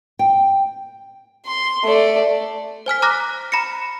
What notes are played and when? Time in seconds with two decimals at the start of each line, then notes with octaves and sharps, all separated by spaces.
0.19 G5
1.46 C6
1.84 A3 D5
2.86 C5 G#5 F6 B6
3.02 A#5 D6 F6 F#6 A#6
3.52 A#5 B5 A#6 C#7